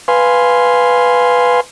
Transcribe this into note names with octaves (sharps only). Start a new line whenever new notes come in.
B4 F5 G#5 C6